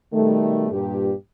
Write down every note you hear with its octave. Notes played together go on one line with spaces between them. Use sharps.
B2 D#3 G3 A3
G2 A#2 G4